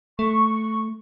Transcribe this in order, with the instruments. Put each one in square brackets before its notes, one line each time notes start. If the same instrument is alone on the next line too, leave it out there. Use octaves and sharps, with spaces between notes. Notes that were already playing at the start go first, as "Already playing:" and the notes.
[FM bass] A3 [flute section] C#6